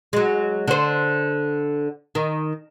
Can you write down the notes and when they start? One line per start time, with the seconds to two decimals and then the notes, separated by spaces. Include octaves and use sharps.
0.13 F#3 G#3
0.68 D3 C5
2.15 D#3